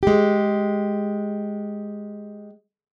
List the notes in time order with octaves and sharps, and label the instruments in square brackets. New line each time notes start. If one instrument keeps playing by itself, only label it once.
[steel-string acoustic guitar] G#3 G4